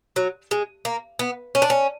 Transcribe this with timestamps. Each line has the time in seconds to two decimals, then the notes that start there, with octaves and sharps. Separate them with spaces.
0.16 F#3
0.51 G#3
0.85 A#3
1.19 B3
1.55 C#4
1.62 D4
1.70 C#4